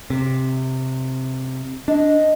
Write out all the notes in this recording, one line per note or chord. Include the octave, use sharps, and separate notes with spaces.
C3
D4 D#5